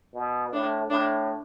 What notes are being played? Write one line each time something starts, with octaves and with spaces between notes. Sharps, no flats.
B2
A2 D4
A2 D4